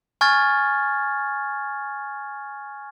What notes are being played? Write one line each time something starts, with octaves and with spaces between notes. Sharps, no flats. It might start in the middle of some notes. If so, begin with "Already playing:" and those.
G#5 C#6 F6 G#6 A6